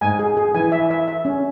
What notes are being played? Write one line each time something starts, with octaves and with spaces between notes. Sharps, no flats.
G#2 G#5
G#4
G#4
E3 G#5
E5
E5
E5
C#4